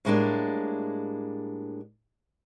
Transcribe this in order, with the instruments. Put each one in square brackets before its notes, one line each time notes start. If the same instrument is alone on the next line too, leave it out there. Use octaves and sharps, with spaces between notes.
[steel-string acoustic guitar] A2 G3 G#3 A#3 C4 D4